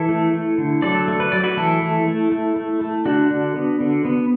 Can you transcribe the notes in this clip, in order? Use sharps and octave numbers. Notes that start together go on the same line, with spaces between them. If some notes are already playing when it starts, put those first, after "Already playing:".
Already playing: E3 E4 A4
A3
A3
D3
F#3 A4 D5
A3
B4
F#3 D5
F#4 B4
E3 E4 A4
A3
A3
A3
A3
A3
D3 D4 F#4
D3
B3
D3
B3